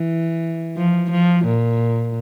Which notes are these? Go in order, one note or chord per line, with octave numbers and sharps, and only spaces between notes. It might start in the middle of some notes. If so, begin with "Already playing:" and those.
Already playing: E3
F3
F3
A#2